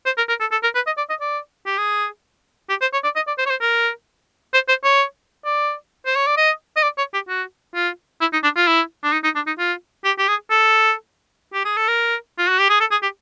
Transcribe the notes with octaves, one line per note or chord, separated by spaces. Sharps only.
C5
A#4
A#4
A4
A4
A#4
B4
D#5
D5
D#5
D5
G4
G#4
G4
C5
C#5
D5
D#5
D5
C5
C#5
C5
A#4
C5
C5
C#5
D5
C5
C#5
D5
D#5
D#5
D5
C#5
G4
F#4
F4
E4
D#4
D4
F4
E4
D4
D#4
D#4
D4
D#4
F4
G4
G4
G#4
A4
G4
G#4
A4
A#4
F4
F#4
G4
G#4
A4
G#4
G4